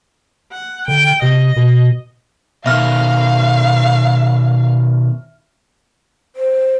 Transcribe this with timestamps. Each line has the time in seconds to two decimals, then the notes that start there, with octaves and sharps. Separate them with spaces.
0.52 F#5
0.88 D3 G5
1.22 C3 D#5
1.57 B2
2.66 B2 D#3 E5 F5 F6
6.36 C5